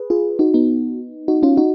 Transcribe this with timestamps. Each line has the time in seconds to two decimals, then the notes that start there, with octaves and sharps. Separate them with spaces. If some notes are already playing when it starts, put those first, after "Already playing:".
Already playing: G#4 B4
0.10 F4 G#4
0.39 D#4 F#4
0.54 B3 D#4
1.28 D#4 F#4
1.43 C#4 F4
1.57 D#4 F#4